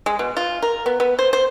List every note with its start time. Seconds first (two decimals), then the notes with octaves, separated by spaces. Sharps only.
0.06 G#3
0.19 B2
0.37 F4
0.62 A#4
0.86 B3
1.00 B3
1.19 C5
1.33 C5